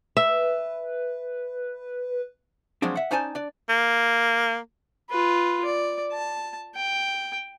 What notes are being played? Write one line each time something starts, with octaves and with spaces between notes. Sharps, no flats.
B4 E5
F3 F#3 G#3 C4 D4
E5 F#5
C#4 D#4 C5 D5 G#5 A5
D4 D5
A#3
F4 B4
D5
A5
G5